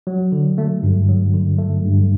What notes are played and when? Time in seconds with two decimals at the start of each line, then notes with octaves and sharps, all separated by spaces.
0.07 F#3
0.32 D3
0.58 A3
0.83 G2
1.08 F#3
1.34 D3
1.59 A3
1.84 G2